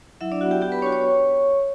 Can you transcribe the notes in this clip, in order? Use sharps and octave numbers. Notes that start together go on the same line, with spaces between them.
F#3 E4 E5
D4 D5
B3 E4 F#4 F#5
G4 G5
B3 G4 G5
B4 B5
D4 F#4 C#5 C#6
C#5 C#6